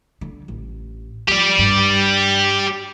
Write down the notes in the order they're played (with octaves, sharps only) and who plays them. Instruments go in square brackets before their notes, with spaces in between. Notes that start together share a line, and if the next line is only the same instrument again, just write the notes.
[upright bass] D3
A1
[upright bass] F2 D#3 [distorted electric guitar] G4 D5
[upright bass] G2